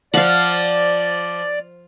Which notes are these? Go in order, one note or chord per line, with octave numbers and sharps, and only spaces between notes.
F3 D5 F5 F#5